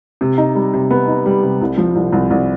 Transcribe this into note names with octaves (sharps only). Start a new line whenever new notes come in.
C3
D#4
G3
C3
B3
D#4
G3
C3
C2
F3
C2
C2
C2